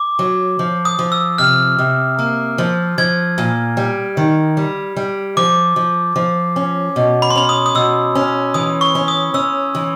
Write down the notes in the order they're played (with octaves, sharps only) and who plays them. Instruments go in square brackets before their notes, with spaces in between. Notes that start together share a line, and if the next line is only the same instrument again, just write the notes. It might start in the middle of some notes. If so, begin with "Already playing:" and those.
Already playing: [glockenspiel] D6
[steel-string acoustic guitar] F#3
F3
[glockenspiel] D#6
[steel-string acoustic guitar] F3
[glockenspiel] E6
[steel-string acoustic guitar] C3 [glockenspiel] F6
[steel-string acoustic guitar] C3
A#3
F3
[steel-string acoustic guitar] F3 [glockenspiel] G#6
[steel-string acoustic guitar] A#2
G3
D#3
G3
G3
[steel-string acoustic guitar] F3 [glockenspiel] D6
[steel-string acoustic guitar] F3
F3
C#4
B2
[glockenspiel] B5
C6
[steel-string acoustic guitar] C#4 [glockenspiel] B5
[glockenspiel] D#6
D#6
[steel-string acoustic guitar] B2 [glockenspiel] E6
[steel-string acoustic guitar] C#4
[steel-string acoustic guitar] E3 [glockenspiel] D#6
[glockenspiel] C#6
[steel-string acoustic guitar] C#4
[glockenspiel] D#6
[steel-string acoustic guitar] C#4 [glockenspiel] E6
[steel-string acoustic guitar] E3